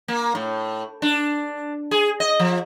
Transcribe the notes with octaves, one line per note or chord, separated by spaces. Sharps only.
A#3
A2
D4
G#4
D#5
F3